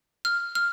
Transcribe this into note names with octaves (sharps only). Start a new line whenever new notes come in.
F6
F6